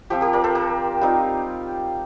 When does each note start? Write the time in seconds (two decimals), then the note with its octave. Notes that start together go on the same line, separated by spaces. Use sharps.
0.10 F3 C4 F4 G4
0.21 G4 A#4
0.33 A#4 D5
0.44 A4 C5
0.55 G4 A#4
1.01 G3 C4 D#4 F4